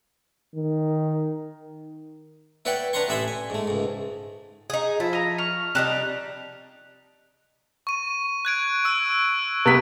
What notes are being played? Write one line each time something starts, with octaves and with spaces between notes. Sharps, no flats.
D#3
E4 B4 C#5 D5 F#5 G5
D4 B4 C#5 A#5 C6 C#6
A1 D5 E5 G#5 B5 C6
G#5
G#2 A3
C#2 G#2
D#4 G#4
F3 E4 F4 A5
D#5 A#5
C#6 F6
C3 G3 D4 D#4 A5 A#5 F#6
C#6 D#7
F#6 G#6 D7
C#6 E6 D7
C3 B3 B6